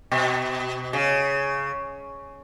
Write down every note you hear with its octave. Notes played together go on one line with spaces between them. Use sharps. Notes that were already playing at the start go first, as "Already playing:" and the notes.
B2
C#3